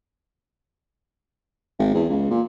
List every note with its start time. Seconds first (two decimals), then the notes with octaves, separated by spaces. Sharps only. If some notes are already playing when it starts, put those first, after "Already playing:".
1.79 G#1
1.94 E2
2.09 C#2
2.30 A#2